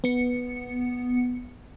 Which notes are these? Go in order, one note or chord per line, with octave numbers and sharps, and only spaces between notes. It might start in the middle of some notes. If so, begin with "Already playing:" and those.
B3 C#7